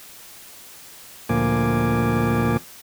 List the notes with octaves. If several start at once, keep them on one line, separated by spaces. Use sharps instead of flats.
D2 A#2 F3 A#3 G#5 D6